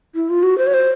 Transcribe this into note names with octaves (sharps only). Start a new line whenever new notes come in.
E4
F4
F#4
C5
C#5
C5